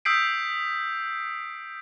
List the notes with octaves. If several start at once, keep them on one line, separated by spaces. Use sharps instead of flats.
D#6 E6 G6 B6 C7 D7